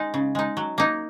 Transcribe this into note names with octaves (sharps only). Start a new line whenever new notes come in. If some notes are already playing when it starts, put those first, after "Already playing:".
Already playing: G#3 D#4
C#3
G#3 D#4
F#3
A#3 D#4